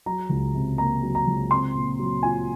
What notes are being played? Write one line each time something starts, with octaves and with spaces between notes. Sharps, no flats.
F#3 A#5
C#2
C3
A#3 A#5
F#3
A#5
C#2
C4 C6
A#2
F#3
F4 G#5